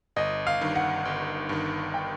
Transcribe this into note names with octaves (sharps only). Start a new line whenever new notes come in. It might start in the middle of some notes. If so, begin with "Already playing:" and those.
G1 D#5
F5
G2 D#3
F#5
G1
G2 D#3
G5